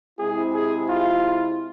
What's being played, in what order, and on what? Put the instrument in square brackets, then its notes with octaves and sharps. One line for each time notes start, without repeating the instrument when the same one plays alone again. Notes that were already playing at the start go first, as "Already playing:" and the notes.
[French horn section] C3 G#3 C4 E4 [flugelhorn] G#4
[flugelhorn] G#4
F4